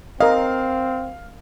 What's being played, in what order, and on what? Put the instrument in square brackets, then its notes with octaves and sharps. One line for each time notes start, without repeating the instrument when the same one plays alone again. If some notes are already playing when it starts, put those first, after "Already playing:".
[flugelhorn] C4 [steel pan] A#4 D#5 [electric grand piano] F5